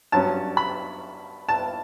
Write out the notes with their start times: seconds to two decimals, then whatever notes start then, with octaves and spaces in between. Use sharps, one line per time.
0.12 G2 F#3 C#4 A5
0.57 B5
1.49 A5